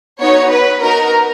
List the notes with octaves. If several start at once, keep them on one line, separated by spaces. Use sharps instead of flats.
B3 D#4 F#4 C#5
B4
B3 D#4 F#4 A#4